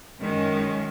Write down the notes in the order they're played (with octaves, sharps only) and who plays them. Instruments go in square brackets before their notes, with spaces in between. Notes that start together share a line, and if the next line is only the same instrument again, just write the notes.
[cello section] F#2 D#3 G#3 C#4